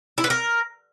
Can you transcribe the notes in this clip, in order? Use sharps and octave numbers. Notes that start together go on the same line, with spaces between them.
E4
B4
A#4